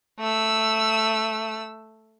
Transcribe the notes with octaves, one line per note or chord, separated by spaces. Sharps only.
A3 E6